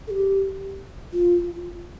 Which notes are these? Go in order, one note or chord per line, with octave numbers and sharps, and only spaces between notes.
A4
G4
F4